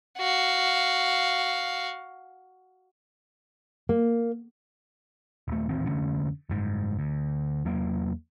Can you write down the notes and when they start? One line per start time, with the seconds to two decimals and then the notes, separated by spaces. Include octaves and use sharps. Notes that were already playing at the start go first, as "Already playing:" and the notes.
0.18 F#4 F5
3.89 A#3
5.48 D#1 A3
5.69 D#1 A1 D#3 C4
5.86 F1 D3 A3 C#4
6.49 F#1 G#2
6.99 D2
7.65 E2 F#3 A#3